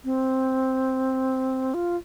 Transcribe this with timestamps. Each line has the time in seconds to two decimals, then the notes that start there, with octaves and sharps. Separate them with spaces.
0.05 C4
1.74 F4